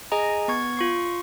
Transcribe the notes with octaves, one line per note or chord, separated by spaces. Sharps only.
G#4 D#5 G#5 A#5
B3 C#6 G#6
F4 C#6 C7